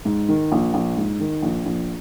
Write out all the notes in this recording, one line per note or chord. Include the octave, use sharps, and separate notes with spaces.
G#2
D#3
A#1
A#1
G#2
D#3
A#1
A#1